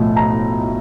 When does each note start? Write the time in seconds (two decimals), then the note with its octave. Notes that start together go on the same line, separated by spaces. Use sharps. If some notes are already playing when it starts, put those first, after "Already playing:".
Already playing: B1 A2 F3 A3
0.16 A#5